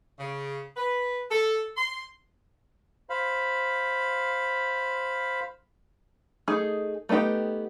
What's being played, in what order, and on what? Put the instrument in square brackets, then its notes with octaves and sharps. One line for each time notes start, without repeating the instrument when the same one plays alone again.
[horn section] C#3
B4
A4
C6
[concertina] C5 F5 B5
[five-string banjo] A3 D#4 G#4
A3 B3 D#4 G4 G5